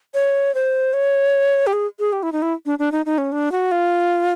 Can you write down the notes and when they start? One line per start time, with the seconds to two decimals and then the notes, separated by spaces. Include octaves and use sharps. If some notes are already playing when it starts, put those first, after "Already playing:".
0.14 C#5
0.55 C5
0.93 C#5
1.67 G4
1.73 G#4
2.00 G#4
2.13 G4
2.23 E4
2.32 D#4
2.42 E4
2.66 D4
2.79 D4
2.92 D#4
3.06 D#4
3.18 C#4
3.32 D4
3.52 F#4
3.72 F4